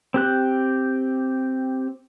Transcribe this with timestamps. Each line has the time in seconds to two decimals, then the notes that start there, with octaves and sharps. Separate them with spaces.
0.14 C4 G4 F#6